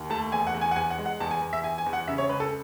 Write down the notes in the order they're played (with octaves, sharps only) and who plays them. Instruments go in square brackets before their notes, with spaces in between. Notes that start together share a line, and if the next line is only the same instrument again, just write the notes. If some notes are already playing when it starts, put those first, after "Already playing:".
Already playing: [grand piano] D#2
A3 A5
E2 G#5
F#5
E2
G#5
F#5
E2 G#5
F#5
G#3
F#5
E2 A5
G#5
E2
E5
E2 G#5
G#5
E2
F#5
C#3 E5
C#5
C#2 B4
A4